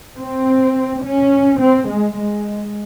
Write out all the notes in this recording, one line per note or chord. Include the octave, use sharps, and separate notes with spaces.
C4
C#4
C4
G#3
G#3